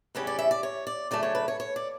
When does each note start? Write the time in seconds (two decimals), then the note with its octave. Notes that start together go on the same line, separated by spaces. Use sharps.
0.15 E2 C#3 G3 C#4 E4 B4
0.27 D5
0.39 E5
0.51 D5
0.63 C#5
0.87 D5
1.11 C#3 F#3 A3 D4 D5
1.23 C#5
1.35 B4
1.48 C#5
1.60 C#5
1.76 D5